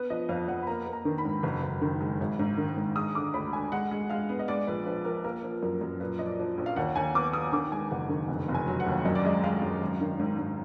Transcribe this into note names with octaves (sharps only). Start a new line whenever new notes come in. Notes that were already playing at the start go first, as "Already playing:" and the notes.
Already playing: B3 B4
F3 D#5
F2 F5
F2 F#5
B5
A#3 A#5
A#3
A#5
D#3
B5
G#2
F#1
F#1
D#3
G#3
G#1
G#2
D#3
G#2
G#3 D#6
D3 D6
D2 B5
D3 G#5
G#3 F#5
G#3
G#3 F5
B3
D#5
G#3 D5
A#1 B4
F3 B4
F3 A#4
A#3 A#4
F3
F#2 A#4
F#2
A#2 B4
F3 D#5
D5
F3
A#1
F5
D#2 F#5
D#2 G#5
B3 D6
B3 D#6
D#3 D6
G#3 G#5
F#1 F#5
D#3
F1
F1
G#5
F#3
F#5
D#2
F#2 D#5
D5
G#3 D#5
G#3 F5
F#2
G#1
D#3
G#2
G#2